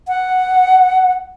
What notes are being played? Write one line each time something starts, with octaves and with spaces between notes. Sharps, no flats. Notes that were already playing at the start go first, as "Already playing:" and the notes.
F#5